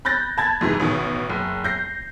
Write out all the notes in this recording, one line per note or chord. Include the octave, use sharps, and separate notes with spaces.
B5 F#6 G6 A6 A#6
A5 B5 G#6 A6
F2 G#2 C3 E3
A1 B2 D#3
F#1
G6 A#6 C7